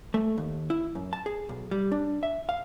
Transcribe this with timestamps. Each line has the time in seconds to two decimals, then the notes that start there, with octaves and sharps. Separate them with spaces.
0.14 A3
0.37 D#2
0.70 E4
0.95 F#2
1.13 A5
1.26 G#4
1.49 B1
1.71 G3
1.92 D4
2.23 E5
2.49 F5